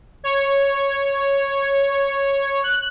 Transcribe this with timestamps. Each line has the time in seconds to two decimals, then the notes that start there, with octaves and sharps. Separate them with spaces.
0.24 C#5
2.64 F#6